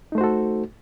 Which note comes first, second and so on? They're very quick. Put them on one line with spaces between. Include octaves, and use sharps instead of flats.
D#4 A3 C5 F#4 A4